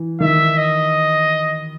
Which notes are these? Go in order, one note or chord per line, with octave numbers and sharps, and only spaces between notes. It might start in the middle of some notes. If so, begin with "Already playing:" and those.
Already playing: E3
D#3 E5
D#5